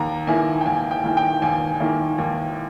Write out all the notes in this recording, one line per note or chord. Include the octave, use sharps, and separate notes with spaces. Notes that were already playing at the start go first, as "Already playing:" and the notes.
Already playing: D#2 A#5
D#3 A#3 E4 G#5
G5
D#2 G#5
G5
D#3 A#3 E4
G5
D#2 G#5
D#3 A#3 E4
D#2